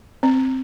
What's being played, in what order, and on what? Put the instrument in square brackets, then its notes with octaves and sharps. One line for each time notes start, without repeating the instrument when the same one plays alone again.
[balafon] C4